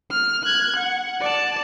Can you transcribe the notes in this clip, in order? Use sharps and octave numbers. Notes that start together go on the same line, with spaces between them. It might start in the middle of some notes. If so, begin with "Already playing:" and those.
F6
F#6 G#6
F#5
D5 A5